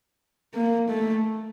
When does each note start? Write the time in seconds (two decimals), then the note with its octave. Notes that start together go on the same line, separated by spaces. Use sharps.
0.54 A#3
0.89 A3